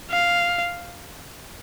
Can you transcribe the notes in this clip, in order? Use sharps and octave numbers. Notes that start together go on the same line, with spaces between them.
F5